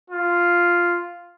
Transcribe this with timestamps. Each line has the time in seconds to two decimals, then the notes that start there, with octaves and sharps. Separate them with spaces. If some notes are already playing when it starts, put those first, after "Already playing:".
0.10 F4